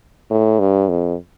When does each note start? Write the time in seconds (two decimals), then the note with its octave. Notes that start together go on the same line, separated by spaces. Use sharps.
0.31 A2
0.60 G2
0.89 F2